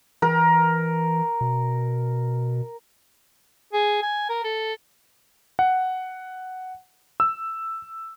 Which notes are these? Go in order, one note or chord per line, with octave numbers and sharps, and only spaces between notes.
E3 A#4
B2
G#4
G#5
A#4
A4
F#5
E6